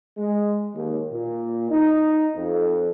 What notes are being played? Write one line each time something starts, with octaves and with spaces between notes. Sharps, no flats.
G#3
D#2
A#2
D#4
F2